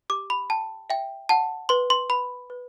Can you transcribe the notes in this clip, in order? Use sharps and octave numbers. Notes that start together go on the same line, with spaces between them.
G4 D6
B5
G5 A5
E5 G5
F#5 A5
B4 C6
C6
B4 B5
B4